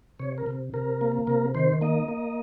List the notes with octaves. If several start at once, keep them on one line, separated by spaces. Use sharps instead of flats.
C3 C#5
A#4
C3
C3 A#4
A#3
C3 A#4
D#3 C5
A#3 D#5
A#3